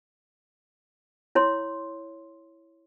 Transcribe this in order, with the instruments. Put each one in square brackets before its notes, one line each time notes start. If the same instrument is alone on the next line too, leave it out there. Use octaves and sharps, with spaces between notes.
[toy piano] E4 C#5 C6